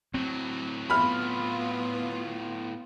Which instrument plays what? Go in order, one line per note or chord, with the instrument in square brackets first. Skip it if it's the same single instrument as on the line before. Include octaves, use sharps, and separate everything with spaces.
[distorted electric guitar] A2 F#3 [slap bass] C4
[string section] B3 F4 [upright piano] B5 F6